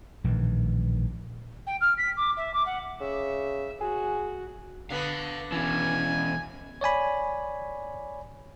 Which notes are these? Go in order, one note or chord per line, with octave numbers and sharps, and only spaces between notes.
A#1 A2 D#3 E3
G5
F6
B6
D6
E5
D6
F#5
C#3 E5
F#4 G#4
D3 B3 B4 F5
B2 E3 C#4 B4 G#5
C#5 D5 G#5 B5